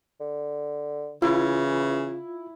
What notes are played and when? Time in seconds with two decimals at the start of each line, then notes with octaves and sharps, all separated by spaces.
0.20 D3
1.22 C#3 E3 E4 F4